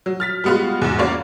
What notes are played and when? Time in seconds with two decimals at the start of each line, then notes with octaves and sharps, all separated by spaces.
0.06 F#3
0.20 F6 A6 B6
0.44 G3 G#3 B3 F4 F#4
0.81 E2 G#2
0.98 A#3 C#4 F#4 C#5 D5 F5